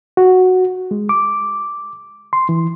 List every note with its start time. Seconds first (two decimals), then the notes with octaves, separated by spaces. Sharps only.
0.17 F#4
0.91 G#3
1.09 D6
2.33 C6
2.49 E3